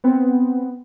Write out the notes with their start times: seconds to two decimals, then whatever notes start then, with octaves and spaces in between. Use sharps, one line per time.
0.04 B3 C4